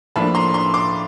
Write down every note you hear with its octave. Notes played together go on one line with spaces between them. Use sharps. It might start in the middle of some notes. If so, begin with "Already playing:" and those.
A2 F3 A#3 D4 A5 B5
A#5 C6
A#5 C6
C6 D6